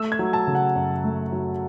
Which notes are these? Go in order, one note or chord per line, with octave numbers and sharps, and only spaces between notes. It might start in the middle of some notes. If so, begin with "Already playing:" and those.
Already playing: A3 E6
G#6
F#3
A5
C#3
F#5
F#2
A3
F#3